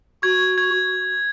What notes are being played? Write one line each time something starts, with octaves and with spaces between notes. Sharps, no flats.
F#4 G#6
G#6